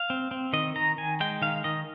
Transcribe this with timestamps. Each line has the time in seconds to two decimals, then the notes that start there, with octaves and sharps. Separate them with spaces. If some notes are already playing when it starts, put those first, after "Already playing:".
Already playing: F5
0.10 C4
0.31 C4
0.53 D#3 D#5
0.76 D#3 A#5
0.98 D#3 G#5
1.20 G#3 G5
1.42 D#3 F5
1.64 D#3 D#5